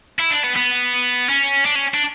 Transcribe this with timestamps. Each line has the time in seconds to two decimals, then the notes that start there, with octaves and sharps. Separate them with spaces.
0.19 E4
0.31 D4
0.44 B3
0.56 B3
1.29 C#4
1.65 D4
1.75 C#4
1.94 D4